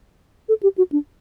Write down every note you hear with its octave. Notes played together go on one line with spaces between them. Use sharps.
A4
G4
F#4
D4